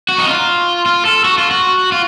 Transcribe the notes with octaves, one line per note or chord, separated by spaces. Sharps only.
F#4
D#4
F4
F4
A4
F#4
F4
F#4
F4